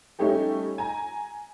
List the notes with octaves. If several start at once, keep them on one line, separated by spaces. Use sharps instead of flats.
G3 A3 C#4 D#4 G4 A4
G#5 A#5